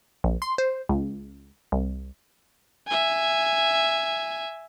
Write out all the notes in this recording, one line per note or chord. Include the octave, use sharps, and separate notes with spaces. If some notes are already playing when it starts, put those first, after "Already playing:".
A#1
C6
C5
C#2
C2
E5 G#5